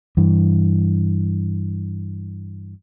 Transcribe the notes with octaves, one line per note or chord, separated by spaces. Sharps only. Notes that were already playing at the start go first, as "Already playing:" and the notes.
G2 E3